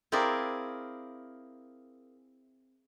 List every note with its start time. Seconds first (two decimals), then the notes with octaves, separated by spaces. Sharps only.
0.12 C4 E4 G#4 A#4 D5 F5